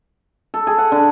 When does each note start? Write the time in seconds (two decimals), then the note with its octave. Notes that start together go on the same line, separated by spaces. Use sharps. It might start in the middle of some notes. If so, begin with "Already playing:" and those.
0.54 A4
0.67 G#4
0.78 F#5
0.92 D3